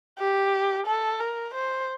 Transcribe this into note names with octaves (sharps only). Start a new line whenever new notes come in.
G4
A4
A#4
C5